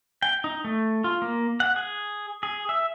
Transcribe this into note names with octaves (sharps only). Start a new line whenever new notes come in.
G5
D#4
A3
F4
A#3
F#5
G#4
G#4
E5